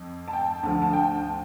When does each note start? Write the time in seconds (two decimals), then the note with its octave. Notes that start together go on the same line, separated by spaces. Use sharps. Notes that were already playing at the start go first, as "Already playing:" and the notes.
Already playing: F2
0.28 A5
0.33 G5
0.63 D2 D3 F3 A5
0.82 A5
0.93 G5